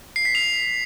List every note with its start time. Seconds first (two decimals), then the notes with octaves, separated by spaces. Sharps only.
0.16 C7
0.25 B6
0.35 F7